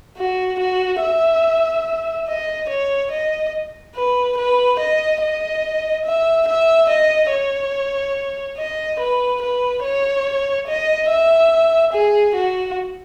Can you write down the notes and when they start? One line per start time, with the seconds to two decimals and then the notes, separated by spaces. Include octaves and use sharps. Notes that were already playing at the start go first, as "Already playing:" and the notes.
0.18 F#4
0.59 F#4
1.02 E5
2.28 D#5
2.69 C#5
3.12 D#5
3.96 B4
4.38 B4
4.79 D#5
5.22 D#5
6.05 E5
6.48 E5
6.89 D#5
7.31 C#5
8.58 D#5
9.00 B4
9.42 B4
9.83 C#5
10.68 D#5
11.10 E5
11.93 G#4
12.35 F#4